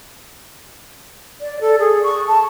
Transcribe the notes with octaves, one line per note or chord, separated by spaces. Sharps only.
D5
A4
G#4
C#6
A5